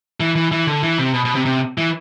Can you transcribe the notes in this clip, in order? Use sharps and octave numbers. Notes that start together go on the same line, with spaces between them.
E3
E3
E3
D3
E3
C3
B2
B2
C3
C3
E3